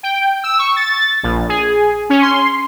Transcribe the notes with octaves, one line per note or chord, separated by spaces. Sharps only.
G5
E6
C#6
A6
A#1
G#4
C#4
C6